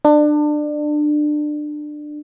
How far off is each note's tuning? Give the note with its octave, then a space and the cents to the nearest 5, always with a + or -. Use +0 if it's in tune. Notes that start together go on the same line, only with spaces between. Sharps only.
D4 +25